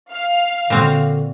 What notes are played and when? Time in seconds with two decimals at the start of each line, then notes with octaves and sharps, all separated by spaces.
0.11 F5
0.70 A#2 D3 C4 F#4